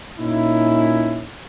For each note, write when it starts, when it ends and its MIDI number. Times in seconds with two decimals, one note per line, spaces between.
0.19 1.27 46
0.19 1.27 61
0.19 1.27 63
0.19 1.27 64